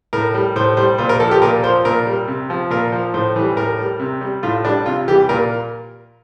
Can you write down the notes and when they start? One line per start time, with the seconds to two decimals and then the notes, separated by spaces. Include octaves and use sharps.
0.13 A2 A#4
0.34 G3
0.56 A2 C5
0.77 G3 C5
0.98 A#2 C5
1.09 A#4
1.20 F3 A4
1.31 G4
1.42 A#2 A#4
1.63 F3 C5
1.85 A#2 A#4
2.07 G3
2.27 C3
2.50 F3
2.70 A#2 A#4
2.92 F3
3.14 A2 C5
3.36 E3 G3
3.57 A2 A#4
3.79 G3
4.00 C3
4.21 G3
4.43 A2 F4
4.65 G3 D4
4.86 C3 F4
5.08 E3 G3 G4
5.29 A#2 A#4